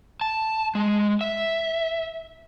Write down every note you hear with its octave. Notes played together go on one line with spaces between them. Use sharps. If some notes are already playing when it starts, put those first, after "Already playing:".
A5
G#3
E5